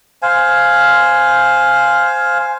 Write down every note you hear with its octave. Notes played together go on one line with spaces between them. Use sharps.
C5 F5 G#5